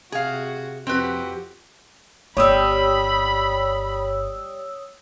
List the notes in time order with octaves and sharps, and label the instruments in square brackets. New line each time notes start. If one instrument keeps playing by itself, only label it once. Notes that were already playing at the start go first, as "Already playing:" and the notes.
[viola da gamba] C3 F#4 [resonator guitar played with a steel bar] G#4 F5
[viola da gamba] F2 F#4 G4 [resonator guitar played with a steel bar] C4 B4
[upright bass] G1 [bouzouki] G3 G4 [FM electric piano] C#5 D#6 E6 [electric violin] B5